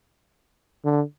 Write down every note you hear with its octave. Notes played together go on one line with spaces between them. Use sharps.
D3